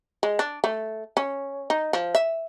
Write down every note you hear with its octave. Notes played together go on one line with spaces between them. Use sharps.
G#3
D4
A3
C#4
D#4
F3
E5